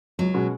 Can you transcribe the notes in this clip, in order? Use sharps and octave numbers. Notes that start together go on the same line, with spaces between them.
C#2 F#3
B2 G#3 C#4 F#4